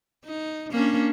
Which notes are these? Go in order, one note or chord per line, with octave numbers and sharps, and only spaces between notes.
D#4
A#3 C#4 D4